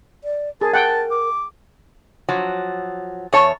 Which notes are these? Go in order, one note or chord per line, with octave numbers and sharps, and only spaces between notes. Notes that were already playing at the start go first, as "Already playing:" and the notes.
D5
G#4 A#4 A5
F#5 G5 A5
D6
F3 F#3
E2 C#5 A5